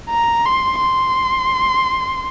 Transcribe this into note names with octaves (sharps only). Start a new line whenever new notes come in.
A#5
C6
C6